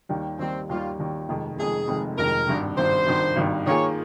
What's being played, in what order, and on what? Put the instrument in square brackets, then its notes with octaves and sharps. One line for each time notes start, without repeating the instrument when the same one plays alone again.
[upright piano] D#2 D#3 G3
[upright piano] D#2 D#3 G3 [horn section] C4
[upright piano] D#2 D#3 G3 [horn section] F4
[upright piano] D#2 D#3 G3
F1 F2 D#3 G#3
[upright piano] F1 F2 D#3 G#3 [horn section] G#4
[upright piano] F1 F2 D#3 G#3
[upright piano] F1 F2 D#3 G#3 [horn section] A#4
[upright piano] G#1 G2 D#3
[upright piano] G#1 G2 D#3 [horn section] C5
[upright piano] G#1 G2 D#3
G#1 G2 D#3
[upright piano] D#3 A#3 F4 G#4 [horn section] C#5